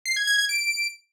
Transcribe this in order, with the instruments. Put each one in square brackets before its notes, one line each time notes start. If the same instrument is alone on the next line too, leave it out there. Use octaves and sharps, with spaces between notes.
[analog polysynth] C7
G#6
G#6
G#6
D7